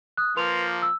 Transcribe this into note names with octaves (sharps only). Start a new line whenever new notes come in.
D#6 F#6
F3 A#3 B4 C6 F7
E6